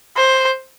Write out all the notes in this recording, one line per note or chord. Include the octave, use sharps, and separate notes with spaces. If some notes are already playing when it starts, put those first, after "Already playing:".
C5